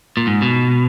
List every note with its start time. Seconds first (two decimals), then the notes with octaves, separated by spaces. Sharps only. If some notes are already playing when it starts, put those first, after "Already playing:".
0.17 A#2
0.27 G#2
0.42 B2